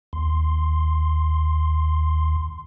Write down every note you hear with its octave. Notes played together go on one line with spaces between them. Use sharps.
D#2 C6